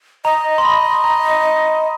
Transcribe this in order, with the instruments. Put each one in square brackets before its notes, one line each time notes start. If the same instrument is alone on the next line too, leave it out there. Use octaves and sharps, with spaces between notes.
[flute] D#5 [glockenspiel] A#5
[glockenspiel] C6
B5
A#5